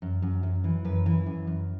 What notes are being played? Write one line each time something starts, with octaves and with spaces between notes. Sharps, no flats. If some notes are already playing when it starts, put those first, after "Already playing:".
F#2
F#2
F#2
E3
F#2 B4
E3
F#2
F#2